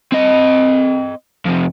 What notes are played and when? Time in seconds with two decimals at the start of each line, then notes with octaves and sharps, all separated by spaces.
0.12 C4 D#5
1.46 F2 C3